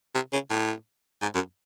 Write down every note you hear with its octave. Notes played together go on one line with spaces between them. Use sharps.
C3
C#3
A2
G#2
F#2